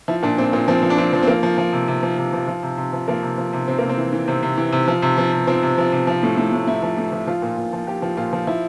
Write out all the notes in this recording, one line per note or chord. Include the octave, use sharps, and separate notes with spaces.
F3 E4
A#2 D4
A#2 C4
A#2 C4
F3 C4
F3
D4
F3 C4
F3
C4
F3 A#3
F3
F3
C3
C3
F3
C3
F3
F3
C3
C3
F3
F3 A#3
C3
F3
C3
C3 C4
C3 A#3
C4
E3
E3
C3 C4
C3
E3
C3
F3
C3
F3
C3
F3 C4
C3
F3
C3
F3
A2
A2
A2
A2 E4
F3
A2
F3
F3 F4
A#2
A#2
F3
F3 G4
F3
A#2 F4
F3
F3 E4